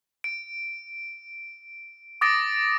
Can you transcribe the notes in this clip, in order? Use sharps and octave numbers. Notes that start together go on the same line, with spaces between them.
D7
D6 D#6 A6 A#6 D7